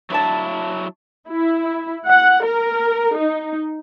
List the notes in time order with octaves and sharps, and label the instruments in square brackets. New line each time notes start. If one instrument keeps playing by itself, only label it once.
[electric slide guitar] F#3 E4 [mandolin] D4 C#5 A5
[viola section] E4
F#5
A#4
D#4